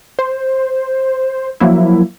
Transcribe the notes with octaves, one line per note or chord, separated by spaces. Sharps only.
C5
F3 F#3 A#3 E4